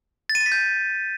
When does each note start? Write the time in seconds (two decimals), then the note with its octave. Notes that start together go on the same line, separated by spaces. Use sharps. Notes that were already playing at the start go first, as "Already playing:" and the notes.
0.29 A6
0.35 D#7
0.41 A6
0.46 B6
0.52 G6